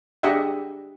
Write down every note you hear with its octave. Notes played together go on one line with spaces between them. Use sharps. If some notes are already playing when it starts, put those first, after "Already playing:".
D4 G4 G#4 D#5 E5 F#5